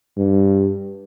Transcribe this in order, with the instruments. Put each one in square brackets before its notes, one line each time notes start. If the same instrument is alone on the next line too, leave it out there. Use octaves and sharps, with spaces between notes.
[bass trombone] G2